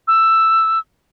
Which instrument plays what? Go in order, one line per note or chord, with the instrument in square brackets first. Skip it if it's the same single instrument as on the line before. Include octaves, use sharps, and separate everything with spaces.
[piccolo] E6